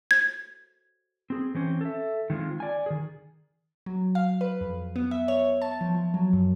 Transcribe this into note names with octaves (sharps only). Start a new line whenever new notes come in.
G#6
C4 G#4
E3 C4 C#4
A4 E5
D#3 G#3 C4 F4
D5 G#5
D#3 G#4
F#3
F5
B4
F2
B3
E5
C#5
A5
F3
F3
F#3
F#2